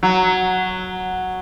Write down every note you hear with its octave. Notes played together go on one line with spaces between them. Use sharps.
F#3